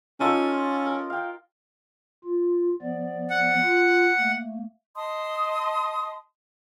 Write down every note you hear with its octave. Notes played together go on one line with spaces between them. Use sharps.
C#4 D#4 F4 A4
A#4
F5 G5
F4
F3 B3 D5
F#5
F4
A3 A#3
D#5 A5 C6 D#6